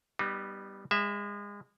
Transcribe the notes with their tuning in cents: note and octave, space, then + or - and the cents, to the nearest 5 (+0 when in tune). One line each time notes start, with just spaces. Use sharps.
G3 +0 B3 +0 D#4 -30
G#3 -30 E5 +0